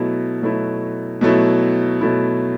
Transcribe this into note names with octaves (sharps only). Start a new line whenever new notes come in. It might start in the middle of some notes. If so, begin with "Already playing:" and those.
Already playing: B2 F#3 A3 E4
B2 F#3 A3 E4
B2 F#3 A3 E4
B2 F#3 A3 E4